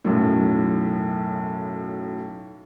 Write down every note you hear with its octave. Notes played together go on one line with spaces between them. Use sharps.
B1 F#2 A2